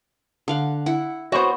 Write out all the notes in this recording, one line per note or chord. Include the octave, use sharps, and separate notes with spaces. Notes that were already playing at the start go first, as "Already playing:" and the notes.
D3 F5 F#5
E4 F#5
B3 F#4 C5 C#5